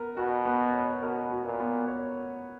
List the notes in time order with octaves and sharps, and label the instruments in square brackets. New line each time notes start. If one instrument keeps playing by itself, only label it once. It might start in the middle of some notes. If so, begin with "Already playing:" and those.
Already playing: [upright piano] B3 A#4
[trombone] B2 [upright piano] F#4
[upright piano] B3
C#5
[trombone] B2 [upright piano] A#4
[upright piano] F#4
[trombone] A#2
[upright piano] B3
C#5